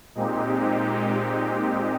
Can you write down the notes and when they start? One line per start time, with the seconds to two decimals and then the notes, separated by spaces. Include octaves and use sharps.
0.15 A#2 G#3 C4 D#4 G4